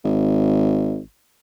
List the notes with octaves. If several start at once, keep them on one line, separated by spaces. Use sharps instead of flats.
G#1